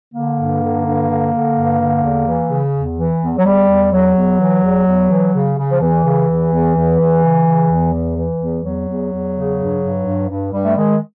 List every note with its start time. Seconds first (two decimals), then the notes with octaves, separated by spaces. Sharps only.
0.14 D3 A#3
0.38 G2
0.62 D3
0.85 G2
1.09 D3
1.33 D3
1.56 G2
1.80 D3
2.03 E2
2.26 E3
2.50 C#3
2.74 E2
2.97 E3
3.21 E2
3.38 F#3
3.45 E2 G3
3.68 E2
3.92 E2 F#3
4.16 E2
4.40 E3
4.63 E2
4.87 E2
5.10 E3
5.33 C#3
5.57 C#3
5.70 F3
5.80 E2 E3
6.04 C#3
6.28 E2
6.52 E2
6.75 E2
6.99 E2
7.23 C#3
7.46 C#3
7.70 E2
7.93 E3
8.17 E3
8.41 E2
8.64 E2 F#3
8.88 E2
9.12 E2
9.35 C#3
9.59 G2
9.82 G2
10.06 G2
10.29 G2
10.53 G2 G3
10.65 A3
10.76 D#3 G#3